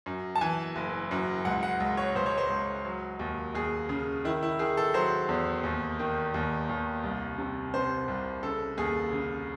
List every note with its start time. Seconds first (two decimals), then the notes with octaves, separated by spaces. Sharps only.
0.06 F#2
0.35 A5
0.41 E3 G#5
0.76 F#1
1.11 F#2
1.45 C#2 F#5
1.63 F#5
1.80 C#2
1.97 C#5
2.15 C#2 C5
2.26 C#5
2.38 C5
2.50 C#2
2.85 F#3
3.19 D#2
3.54 D#2 G#4
3.89 C#3
4.25 D#3 E4
4.43 E4
4.59 D#3 G#4
4.77 A4
4.94 F#3 C5
5.29 E2
5.63 D#2
5.99 D#3
6.34 D#2
6.69 D#2
7.03 C2
7.38 C3
7.74 C3 C5
8.08 C2
8.43 C#3 A4
8.78 D#2 G#4
9.12 C#3